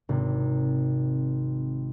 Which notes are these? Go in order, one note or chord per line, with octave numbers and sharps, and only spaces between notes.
G#1 C3